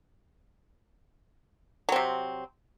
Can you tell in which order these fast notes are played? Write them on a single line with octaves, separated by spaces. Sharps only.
F#3 C4 C3